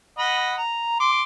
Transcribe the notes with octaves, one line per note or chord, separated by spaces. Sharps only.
D#5 F#5 B5
A#5
C6 D6